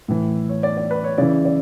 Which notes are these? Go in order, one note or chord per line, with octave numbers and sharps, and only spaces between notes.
A2 E3
C#5
D5
D5
B4
C#5
C#3 E3 D5
D5